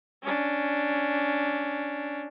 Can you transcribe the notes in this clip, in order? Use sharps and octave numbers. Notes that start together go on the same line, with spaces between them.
C#4 D4